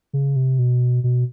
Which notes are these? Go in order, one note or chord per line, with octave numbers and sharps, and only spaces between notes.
C#3
C3
B2
B2